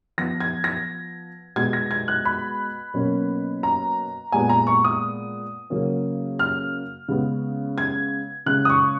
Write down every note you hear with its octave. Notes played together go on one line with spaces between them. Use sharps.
F3 B3 A#6
G#6
A#6
B2 G#3 B3 G#6
A#6
G#6
F#6
B5
B2 F#3 A#3 C#4
A#5
A#2 G#3 B3 G#5
A#5
C#6
D#6
C#3 F#3 A#3 C#4
F6
C#3 G#3 B3
G#6
C#3 G#3 C#4 F#6
D#6
C#6